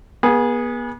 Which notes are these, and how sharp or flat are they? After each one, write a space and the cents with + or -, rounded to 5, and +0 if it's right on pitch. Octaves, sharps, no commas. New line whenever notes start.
B3 -40 G#4 -10